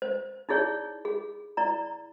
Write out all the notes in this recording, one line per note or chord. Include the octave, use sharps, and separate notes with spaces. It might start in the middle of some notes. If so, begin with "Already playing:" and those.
C5
D#4 E4 G#4 C#5 D5
G#4
E4 D5 A#5